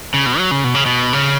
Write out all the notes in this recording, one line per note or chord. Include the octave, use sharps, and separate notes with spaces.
C#3
B2
F#3
C#3
B2
C#3
B2
C#3